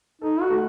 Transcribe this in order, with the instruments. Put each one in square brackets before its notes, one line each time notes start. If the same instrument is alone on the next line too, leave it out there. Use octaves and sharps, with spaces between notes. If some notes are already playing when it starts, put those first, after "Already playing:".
[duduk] D#4 [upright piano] A4
[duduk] F#4
[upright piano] A3